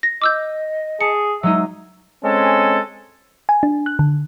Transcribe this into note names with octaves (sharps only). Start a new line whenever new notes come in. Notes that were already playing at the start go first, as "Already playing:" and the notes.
A#6
D#5 D6 E6 G6
G#4 A5 C#7
F#3 G#3 D#4 E5
G#3 C4 C#4 A4 G#5
G#5
D4
F#6
D3